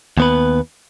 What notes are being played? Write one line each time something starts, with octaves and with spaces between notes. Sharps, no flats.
D#2 B3 B4